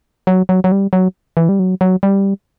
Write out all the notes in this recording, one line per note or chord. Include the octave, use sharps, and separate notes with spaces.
F#3
F#3
F#3
G3
F#3
E3
G3
F#3
F#3
G3